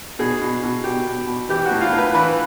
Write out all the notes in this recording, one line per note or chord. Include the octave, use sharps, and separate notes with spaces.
B2 G#4
B2
B2
B2 G4
B2
B2
E3 G4
F#4
A2
F4
A2
B4
E3 B4